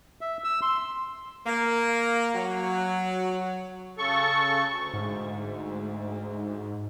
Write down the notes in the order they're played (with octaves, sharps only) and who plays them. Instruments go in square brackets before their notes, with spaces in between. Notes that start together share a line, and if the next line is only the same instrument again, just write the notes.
[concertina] E5
E6
C6
[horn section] A#3
F#3
[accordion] C#3 A4 C#6
D2
[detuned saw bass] G#2